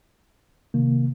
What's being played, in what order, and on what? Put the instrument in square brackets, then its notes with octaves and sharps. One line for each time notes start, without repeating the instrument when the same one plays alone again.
[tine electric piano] C3 D#3 A#3